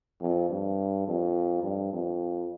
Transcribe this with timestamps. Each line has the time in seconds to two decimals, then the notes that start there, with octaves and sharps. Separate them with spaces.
0.21 F2
0.50 G2
1.07 F2
1.63 G2
1.93 F2